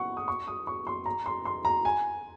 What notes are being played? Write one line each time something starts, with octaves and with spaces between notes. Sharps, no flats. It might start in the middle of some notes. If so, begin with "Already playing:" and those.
Already playing: F#5 C#6
D#6
C#6
D#6
C#6
C6
A#5
C6
C6
A#5
G#5